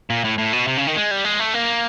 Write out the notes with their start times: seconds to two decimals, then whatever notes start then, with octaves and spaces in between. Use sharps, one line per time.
0.10 A#2
0.24 A2
0.38 A2
0.53 B2
0.67 C3
0.77 C#3
0.87 D#3
0.96 G#3
1.11 G3
1.24 G#3
1.39 A3
1.54 A#3